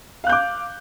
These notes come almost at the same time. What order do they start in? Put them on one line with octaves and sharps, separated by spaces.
F5 F#6 G6 D6